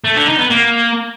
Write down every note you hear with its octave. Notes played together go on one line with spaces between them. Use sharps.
A3
D3
D#4
B3
A#3